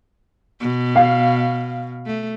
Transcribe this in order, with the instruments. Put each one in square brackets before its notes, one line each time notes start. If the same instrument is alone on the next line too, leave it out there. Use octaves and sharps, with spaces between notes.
[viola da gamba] B2
[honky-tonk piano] F5
[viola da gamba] A3